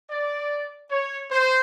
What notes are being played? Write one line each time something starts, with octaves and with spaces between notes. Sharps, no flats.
D5
C#5
C5